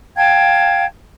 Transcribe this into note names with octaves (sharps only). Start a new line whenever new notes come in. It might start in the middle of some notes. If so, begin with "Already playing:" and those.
F5 G5 A5 G#6